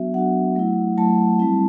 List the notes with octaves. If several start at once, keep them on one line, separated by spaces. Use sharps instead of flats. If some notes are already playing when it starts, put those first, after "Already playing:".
Already playing: F#3 B3 D4 F#4 E5
F#3 B3 D4 F#4 F#5
F#3 A3 E4
F#3 A3 E4 A5
G3 C4 E4